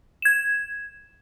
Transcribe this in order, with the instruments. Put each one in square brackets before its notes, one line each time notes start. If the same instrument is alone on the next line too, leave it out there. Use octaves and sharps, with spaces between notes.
[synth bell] G#6 E7